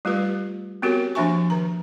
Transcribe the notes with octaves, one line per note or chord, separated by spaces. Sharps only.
G3 A3 F4 G4 B4
B3 C4 F#4 G4 A#4 C#5
F3 A#3 D4 E5 G#5 C#6
D#3 A#5